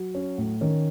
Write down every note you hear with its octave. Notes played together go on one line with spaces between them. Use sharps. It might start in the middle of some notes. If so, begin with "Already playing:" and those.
Already playing: F#3
C#4
A2
D#3 C#4